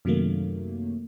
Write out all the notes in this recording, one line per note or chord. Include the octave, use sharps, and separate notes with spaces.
F#2 C3 D#3 F#3 A3 A#3